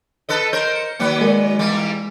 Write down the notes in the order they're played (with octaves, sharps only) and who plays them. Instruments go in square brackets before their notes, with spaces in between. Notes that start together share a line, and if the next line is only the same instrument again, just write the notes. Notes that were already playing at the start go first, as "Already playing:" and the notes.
[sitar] A4 B4 D#5
[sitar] A#4 C5 [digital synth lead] G6
[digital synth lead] C#7
[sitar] D#3 F#3 B4 [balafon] A#3
[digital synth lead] G#3 [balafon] A#4 D5
[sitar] E2 G3 A#3